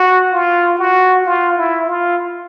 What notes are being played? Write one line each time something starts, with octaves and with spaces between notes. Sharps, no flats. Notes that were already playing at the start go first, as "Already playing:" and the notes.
Already playing: F#4
F4
F#4
F4
E4
F4